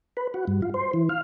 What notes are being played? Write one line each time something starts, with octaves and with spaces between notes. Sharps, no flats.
B4
F#4
G2
F4
C5
E3
F5